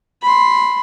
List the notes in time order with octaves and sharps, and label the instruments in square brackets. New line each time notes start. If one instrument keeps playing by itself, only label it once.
[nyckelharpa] B5 C6